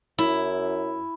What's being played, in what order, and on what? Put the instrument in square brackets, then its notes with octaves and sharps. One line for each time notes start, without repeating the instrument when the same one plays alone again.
[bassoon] F#2 [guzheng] E4